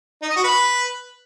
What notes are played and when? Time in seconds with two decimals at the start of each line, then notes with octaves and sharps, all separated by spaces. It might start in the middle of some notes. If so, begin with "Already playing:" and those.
0.22 D#4
0.29 D#5
0.36 F#4
0.44 B4